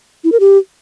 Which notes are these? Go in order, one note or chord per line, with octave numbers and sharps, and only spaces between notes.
E4
A#4
G4